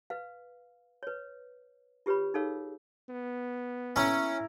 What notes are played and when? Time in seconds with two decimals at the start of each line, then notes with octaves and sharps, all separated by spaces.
0.10 B4 F5
1.03 B4 C#5
2.06 F4 G4 B4 C#5 B5
2.34 D#4 G#4 A4 C#5 F5 E6
3.09 B3
3.96 C#4 E4 A#5